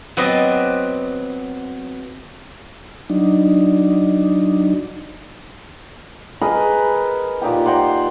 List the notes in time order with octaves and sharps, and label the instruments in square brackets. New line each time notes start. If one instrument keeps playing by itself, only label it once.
[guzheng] F#3 B3 C4 B4 D5 D#5
[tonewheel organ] F#3 D4 D#4
[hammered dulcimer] G#4 A#4 B4 D#5
A#2 D#4 G4 G5
C5 F#5 G5 A#5